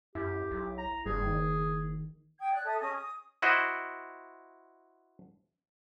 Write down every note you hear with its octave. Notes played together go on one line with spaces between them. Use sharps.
F#2 E4 G4
B1
A#5
F#1 G2 G#4
D#3
G5 D#6 G#6
D5 F#6 G#6
A4 E5 D#6
C#4 G#4 D#5 D#6
D#6
E4 F#4 C5 D#5